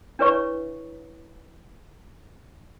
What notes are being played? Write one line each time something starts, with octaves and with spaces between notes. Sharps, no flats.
D4 E4 B4 C#5 E5 C#6